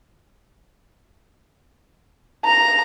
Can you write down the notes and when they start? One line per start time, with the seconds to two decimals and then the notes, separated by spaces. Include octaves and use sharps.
2.45 A#5